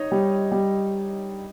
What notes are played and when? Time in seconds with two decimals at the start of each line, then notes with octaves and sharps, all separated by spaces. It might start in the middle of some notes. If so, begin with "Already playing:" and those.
Already playing: D#4 C#5 D#5
0.12 G3
0.52 G3